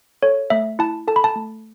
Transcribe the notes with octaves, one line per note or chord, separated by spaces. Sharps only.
A4 C#5
A3 E5
E4 A5
A4 A5
B5
A5
A3